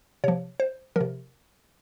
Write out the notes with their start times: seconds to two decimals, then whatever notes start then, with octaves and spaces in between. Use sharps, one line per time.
0.24 C3 F3 C#5
0.60 C5
0.96 C3 F3 A#4